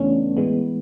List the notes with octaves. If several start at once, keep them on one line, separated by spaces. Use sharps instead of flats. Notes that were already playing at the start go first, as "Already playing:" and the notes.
Already playing: E2 C#3 E3 A3 B3 C#4 D4
A2 E3 G#3 B3